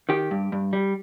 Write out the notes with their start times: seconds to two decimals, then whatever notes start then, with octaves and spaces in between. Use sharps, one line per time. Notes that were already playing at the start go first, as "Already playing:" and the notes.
0.09 D#3 G4
0.31 G2
0.52 G2
0.73 G3